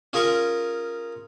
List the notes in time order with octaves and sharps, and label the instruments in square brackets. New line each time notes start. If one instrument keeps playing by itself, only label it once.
[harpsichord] C#4 F4 G#4 A#4 A#5 C#6